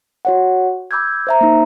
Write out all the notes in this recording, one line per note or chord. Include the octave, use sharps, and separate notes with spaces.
F#4 C#5 F#5
B5 D6 E6 G6 G#6
C5 E5 A#5
A#3 D#4